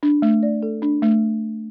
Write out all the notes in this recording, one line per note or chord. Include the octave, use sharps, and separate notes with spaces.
D4
A3
D5
A4
D4
A3